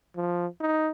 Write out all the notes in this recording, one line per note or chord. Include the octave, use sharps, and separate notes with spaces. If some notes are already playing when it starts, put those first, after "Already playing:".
F3
D#4